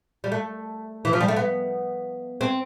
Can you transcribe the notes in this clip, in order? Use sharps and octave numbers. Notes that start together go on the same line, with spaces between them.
G3
A3
E3
F3
G3
A3
B3
C4